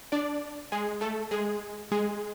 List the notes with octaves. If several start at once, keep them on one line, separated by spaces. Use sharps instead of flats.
D4 D5
G#3 G#4
A3 A4
G#3 G#4
G#3 G#4